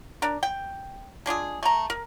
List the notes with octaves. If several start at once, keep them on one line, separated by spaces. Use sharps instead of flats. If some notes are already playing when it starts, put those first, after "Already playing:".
D4 A#4
G5
G#3 D4 F4 G#4
A3 A#5
A#4